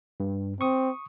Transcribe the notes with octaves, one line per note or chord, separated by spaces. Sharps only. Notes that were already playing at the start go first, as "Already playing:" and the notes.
G2
C4 C#6 D#6